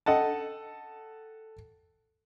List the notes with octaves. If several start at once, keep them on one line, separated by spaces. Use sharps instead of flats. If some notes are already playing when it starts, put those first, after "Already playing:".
A4 D#5 F#5 G5 A5